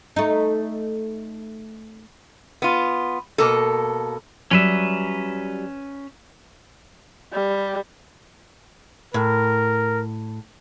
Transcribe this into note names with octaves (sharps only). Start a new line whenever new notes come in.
A3 D#4
B3 F4
B2 A#3 A4
F#3 G3 C#4 B4 E5
G3
A2 A#4